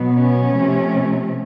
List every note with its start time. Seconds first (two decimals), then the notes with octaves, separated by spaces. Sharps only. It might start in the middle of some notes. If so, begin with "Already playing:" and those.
Already playing: B2 F#3 B3
0.13 C#4
0.55 C3 F3 A3